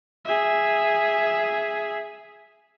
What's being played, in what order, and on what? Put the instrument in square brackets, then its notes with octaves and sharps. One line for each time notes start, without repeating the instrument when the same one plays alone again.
[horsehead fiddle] G#4 E5